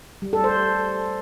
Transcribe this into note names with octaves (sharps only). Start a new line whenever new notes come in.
G3
A4
C5